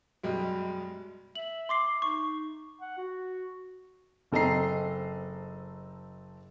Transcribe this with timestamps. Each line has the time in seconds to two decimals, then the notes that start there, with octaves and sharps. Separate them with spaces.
0.24 F#2 B2 G3 G#3
1.35 E5 F#7
1.69 C6 D6 C7
2.02 D#4 C#6
2.81 F#5
2.97 F#4
4.32 F#1 C4 A4 D#5 A#5 C7